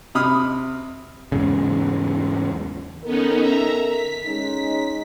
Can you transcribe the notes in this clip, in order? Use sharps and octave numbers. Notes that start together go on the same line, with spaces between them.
C3 B5 D#6 F6
E2 G#2 C#3
D#3 B3 C#4 D#4 A4 A#4
E5 A#5
B6
G#3 C#4 D#4